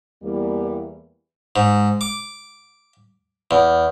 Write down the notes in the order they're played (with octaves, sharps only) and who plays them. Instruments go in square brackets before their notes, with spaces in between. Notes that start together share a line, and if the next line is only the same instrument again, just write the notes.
[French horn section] E2 G3 A#3
[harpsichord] G#2
D6
E2